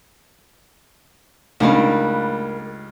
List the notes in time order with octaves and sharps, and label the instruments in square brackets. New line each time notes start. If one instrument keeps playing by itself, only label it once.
[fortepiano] C#2 G2 [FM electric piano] A3 [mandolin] A#3 A#4 B4 [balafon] C#4 D#4